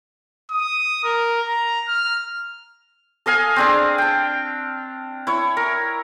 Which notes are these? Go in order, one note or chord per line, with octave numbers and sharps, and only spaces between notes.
D#6
A#4
A#5
F6
A4 D#5 F5 G#5
C4 D4 G#4
G5 A5
E4 C#5
A#4